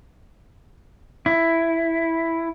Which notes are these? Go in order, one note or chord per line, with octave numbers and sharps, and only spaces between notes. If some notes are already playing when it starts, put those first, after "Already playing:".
E4